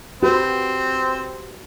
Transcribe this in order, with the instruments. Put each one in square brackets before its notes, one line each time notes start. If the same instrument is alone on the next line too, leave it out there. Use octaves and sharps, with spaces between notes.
[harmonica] C4 [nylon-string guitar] F#4 G4 B4